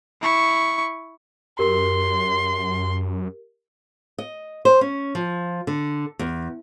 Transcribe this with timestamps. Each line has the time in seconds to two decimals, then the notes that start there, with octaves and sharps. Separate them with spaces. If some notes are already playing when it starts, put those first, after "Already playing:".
0.22 E4 C#6
1.59 F#2 G4 A#4 C6
4.18 D#5
4.65 C5
4.81 C#4
5.15 F3
5.67 D3
6.19 E2